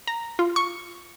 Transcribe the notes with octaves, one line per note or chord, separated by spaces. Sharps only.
A#5
F4
C#6